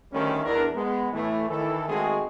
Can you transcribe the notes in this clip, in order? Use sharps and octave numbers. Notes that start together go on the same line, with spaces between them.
D2 D#3 G3 A3 C#4
E2 D4 A#4
G#3 B3
A2 E3 A3
D#3 E3 A4
D#3 G#3 A3 C4 F#4 G#4